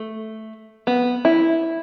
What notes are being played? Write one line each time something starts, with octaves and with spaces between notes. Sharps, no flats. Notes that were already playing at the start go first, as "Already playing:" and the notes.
Already playing: A3
B3
E4